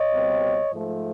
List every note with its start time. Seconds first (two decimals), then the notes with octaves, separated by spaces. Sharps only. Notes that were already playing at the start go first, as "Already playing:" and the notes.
Already playing: C#5 D#5
0.13 B2 G3 C4
0.72 G#2 F3 A3